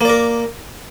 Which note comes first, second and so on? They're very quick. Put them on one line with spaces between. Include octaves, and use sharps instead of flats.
A#3 D5 A#4